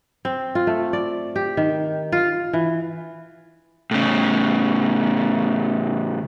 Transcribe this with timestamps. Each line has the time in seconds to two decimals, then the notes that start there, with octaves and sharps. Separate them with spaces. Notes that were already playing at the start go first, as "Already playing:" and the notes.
0.25 C4
0.55 F4
0.67 A3
0.93 D5
1.36 G4
1.57 D#3
2.12 F4
2.53 E3
3.91 A2 C#3